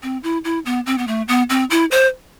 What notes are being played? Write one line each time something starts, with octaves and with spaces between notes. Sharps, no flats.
C4
E4
E4
B3
C4
B3
A3
B3
C4
E4
C5